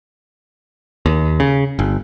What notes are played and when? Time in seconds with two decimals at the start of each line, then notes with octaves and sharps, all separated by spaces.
1.06 D#2
1.40 C#3
1.79 G1